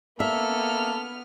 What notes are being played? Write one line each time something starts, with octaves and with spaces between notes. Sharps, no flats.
A#3 B3 A4 E5 F6